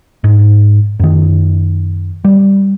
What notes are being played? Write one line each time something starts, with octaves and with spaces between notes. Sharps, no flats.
G#2
F#2 D#3
G3